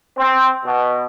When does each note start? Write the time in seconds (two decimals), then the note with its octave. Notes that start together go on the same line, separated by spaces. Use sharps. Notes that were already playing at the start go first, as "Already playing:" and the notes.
0.17 C4
0.64 B2